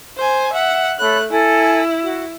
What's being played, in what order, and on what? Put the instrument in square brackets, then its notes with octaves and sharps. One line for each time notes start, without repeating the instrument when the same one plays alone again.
[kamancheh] C5 G#5
E5 F#5
[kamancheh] A3 F#6 [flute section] A4 C#5 B5
[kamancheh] E4 [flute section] A4 G#5
[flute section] F#4